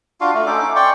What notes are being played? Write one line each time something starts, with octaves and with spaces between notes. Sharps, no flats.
D4 F4 F#4 F5
A3
C#4 D#4 A4 D6
D6
D5 G5 C6 C#6